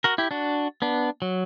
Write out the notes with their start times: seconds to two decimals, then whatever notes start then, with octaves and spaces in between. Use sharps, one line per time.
0.04 F#4 A#4
0.18 E4 G4
0.31 D4 F#4
0.82 B3 D4
1.22 F#3